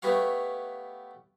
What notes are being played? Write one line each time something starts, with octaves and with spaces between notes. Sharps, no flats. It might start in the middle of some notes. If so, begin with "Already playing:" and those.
A3 B3 G4 B4 C#5 F5